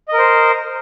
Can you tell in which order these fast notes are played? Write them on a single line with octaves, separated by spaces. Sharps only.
D#5 A#4 C5